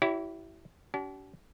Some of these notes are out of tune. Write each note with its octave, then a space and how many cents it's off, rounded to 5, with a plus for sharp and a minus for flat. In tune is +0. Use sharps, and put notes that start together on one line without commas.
E4 +0 G4 -40 C#5 +40
D4 -45 G4 -45